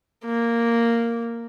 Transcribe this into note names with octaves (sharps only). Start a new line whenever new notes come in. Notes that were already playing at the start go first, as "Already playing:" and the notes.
A#3